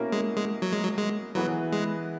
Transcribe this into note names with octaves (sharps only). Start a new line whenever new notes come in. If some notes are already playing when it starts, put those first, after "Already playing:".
Already playing: B2 A#3 C#4 E4 A#4
G#3
G#3
F#3
G#3
F#3
G#3
E3 F#3 B3 E4 G#4 B4
G#3